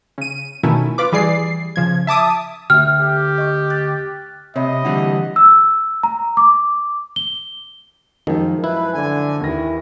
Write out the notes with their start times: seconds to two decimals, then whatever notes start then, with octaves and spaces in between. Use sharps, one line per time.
0.18 C#3 D#7
0.63 B2 D#3 A3 C#4 E4
0.98 F4 B4 D6
1.12 E3 G3 G#4 D5 C7
1.76 C#3 F3 G#6
2.07 E5 A5 D6 D#6
2.70 D2 E5 G5 F6
3.01 G4
3.38 D#5 C#6
3.70 F#6 A6
4.56 C3 C#5 D#5 E5 B5
4.85 D3 E3 G3 F#5
5.36 E6
6.03 A#5
6.37 D6
7.16 G7
8.27 F#2 D#3 F3 G#3
8.64 E4 B4
8.94 D3 G#5
9.41 D#2 E3 A#6